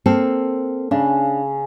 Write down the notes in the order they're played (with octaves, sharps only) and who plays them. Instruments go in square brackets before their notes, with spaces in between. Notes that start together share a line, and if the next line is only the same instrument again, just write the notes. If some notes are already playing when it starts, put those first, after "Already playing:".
[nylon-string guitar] A#3 C4 A4
[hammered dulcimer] C#3 [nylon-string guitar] D4